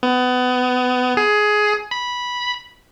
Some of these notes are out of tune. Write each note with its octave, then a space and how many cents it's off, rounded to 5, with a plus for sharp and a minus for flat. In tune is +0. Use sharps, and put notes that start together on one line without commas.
B3 +25
G#4 +15
B5 -10